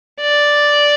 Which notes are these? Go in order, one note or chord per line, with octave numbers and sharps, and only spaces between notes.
D5